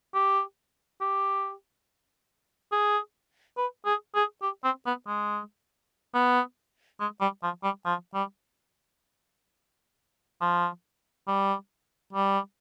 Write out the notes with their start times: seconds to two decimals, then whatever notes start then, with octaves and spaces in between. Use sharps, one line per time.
0.15 G4
1.01 G4
2.72 G#4
3.57 B4
3.85 G#4
4.15 G#4
4.42 G4
4.64 C4
4.86 B3
5.07 G#3
6.15 B3
7.00 G#3
7.21 G3
7.43 F3
7.63 G3
7.86 F3
8.14 G3
10.41 F3
11.28 G3
12.13 G3